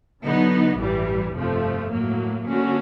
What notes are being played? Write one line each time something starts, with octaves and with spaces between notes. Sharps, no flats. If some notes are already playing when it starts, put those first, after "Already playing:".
D3 F#3 B3 D#4
A1 G2 E3 G3
G1 F2 C3 F3 A3
A2 F#3 A#3
D3 F#3 A#3 C#4 F#4